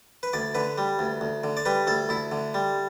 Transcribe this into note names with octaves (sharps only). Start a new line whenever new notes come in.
B4
D2 D5
D3 B4
G3
D2
D2
D3
D5
G3 B4
D2 A4
D2 E4
D3
G3